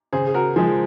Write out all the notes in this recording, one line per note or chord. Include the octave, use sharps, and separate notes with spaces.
C#3 G#4 C5
G#4
F#4 A#4
F3 G#3 G#4 C5